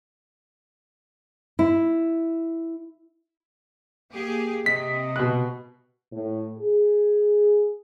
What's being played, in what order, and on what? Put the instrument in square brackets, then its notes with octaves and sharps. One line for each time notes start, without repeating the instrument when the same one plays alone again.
[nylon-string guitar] E4
[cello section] A#3 G4 G#4
[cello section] C3 [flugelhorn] D#5 [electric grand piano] B6
[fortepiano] B2 F#6
[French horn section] A2
G#4